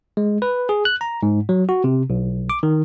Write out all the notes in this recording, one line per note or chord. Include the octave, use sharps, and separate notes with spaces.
G#3
B4
G#4
F#6
A#5
G#2
F#3
F#4
C3
B1
D6
D#3